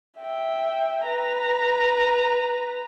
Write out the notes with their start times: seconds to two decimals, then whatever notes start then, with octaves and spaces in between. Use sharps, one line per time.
0.19 E5 G5
1.06 B4 A#5